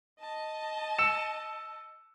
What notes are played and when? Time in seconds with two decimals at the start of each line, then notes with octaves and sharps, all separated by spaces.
0.20 D#5 A5
0.99 E6 C#7 E7